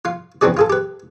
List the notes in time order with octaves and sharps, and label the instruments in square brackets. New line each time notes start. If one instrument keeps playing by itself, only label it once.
[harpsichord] F4 F5
E2 C4 D4 F#4 G#4 D5
F4 G#4 A4
G4 B4